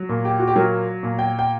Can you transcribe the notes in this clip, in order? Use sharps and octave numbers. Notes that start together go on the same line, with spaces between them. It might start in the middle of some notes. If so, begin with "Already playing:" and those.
Already playing: F#3
A#2
G4
F#4
G4
F#3 A#4
A#2
G5
G5